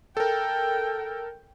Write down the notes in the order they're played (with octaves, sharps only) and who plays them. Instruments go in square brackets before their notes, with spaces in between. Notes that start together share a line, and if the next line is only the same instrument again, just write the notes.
[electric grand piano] A4 A#4 [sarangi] G5